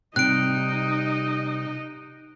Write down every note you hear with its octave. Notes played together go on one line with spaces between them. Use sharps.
C3 G3 D#4 D#5 F#6 D7